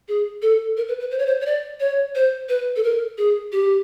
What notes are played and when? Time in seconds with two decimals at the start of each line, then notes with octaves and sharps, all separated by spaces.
0.08 G#4
0.42 A4
0.77 A#4
0.88 B4
1.00 B4
1.11 C5
1.18 C#5
1.26 C5
1.41 C#5
1.46 D5
1.80 C#5
2.15 C5
2.49 B4
2.76 A4
2.83 A#4
3.18 G#4
3.52 G4